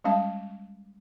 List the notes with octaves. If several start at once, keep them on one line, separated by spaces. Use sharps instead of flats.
G3 G#3 C#4 F5 A5